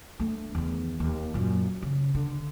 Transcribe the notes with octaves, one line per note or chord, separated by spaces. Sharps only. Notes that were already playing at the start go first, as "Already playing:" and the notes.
A3 D4
E2 D#3
D#2
F#2 A#2
C#3
D3